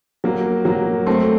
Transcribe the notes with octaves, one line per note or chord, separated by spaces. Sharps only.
F#3 A#3
F#3 A#3
A3 C4